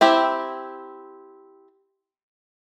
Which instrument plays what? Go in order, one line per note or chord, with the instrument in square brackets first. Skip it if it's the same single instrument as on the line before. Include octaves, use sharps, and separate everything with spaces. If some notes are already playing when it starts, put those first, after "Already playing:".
[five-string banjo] C4 E4 G4